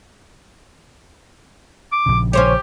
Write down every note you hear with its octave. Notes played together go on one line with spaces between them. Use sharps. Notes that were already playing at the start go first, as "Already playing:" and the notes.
D6
A#1 C#3
C#4 G4 C5 C#5